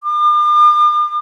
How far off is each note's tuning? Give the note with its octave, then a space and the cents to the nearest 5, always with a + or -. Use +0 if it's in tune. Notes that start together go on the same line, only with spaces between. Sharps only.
D6 +45